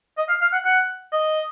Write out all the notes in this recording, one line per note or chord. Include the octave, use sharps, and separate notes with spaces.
D#5
F5
F5
F#5
F#5
D#5